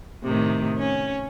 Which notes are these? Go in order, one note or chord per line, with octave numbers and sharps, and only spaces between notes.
A2 C3 D#3
C#4